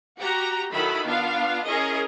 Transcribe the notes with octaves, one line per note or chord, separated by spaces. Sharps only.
F#4 G4 A#5
D#3 F#3 E4 A4 B5
B3 D4 F4 F5
C#4 E4 G#4 A#4 D#5